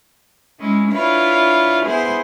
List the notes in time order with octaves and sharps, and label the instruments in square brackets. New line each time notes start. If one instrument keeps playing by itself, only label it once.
[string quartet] G#3 C#4 E4
D4 E4 F4 B4 C#5
B3 E4 G#4 B4 C5